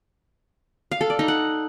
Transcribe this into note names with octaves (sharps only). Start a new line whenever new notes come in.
F5
A4
D5
D#4
F#5